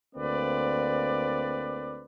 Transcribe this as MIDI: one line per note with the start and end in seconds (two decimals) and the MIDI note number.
0.15 2.04 38
0.15 2.04 58
0.15 2.04 60
0.15 2.04 71
0.15 2.04 74